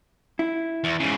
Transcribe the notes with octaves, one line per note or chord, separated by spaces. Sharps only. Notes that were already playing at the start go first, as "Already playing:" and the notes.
E4
E2
G#2 C#3